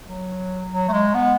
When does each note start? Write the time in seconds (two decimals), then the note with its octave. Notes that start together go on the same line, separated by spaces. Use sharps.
0.07 F#3
0.72 F#3
0.89 A3
0.92 G#3
1.14 B3